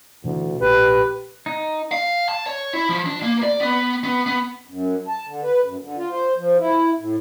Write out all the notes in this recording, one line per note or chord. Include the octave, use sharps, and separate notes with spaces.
D2 B2 D3 E3
A#1 G4 B4
D#4
F5
A5
C#5
E4
F3
D4
A#3
D5
B3
B3
B3
F#2
A5
D3
B4
F#2
D3
F4
C5
F3
E4
A2